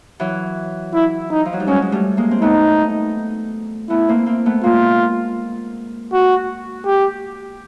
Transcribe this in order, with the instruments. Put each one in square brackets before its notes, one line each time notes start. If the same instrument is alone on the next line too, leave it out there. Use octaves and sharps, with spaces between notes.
[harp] E3 F#3
[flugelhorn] E4
D#4
[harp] F3
F#3
G3
[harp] F#3 G#3 [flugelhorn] C#4
[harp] G#3
G3 A3
G#3 A#3
C4
[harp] A3 B3 [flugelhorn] D#4
[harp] A3 B3 [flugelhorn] E4
[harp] A#3 C4
A#3 C4
A3 B3
[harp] G#3 A#3 [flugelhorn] F4
[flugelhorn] F#4
G4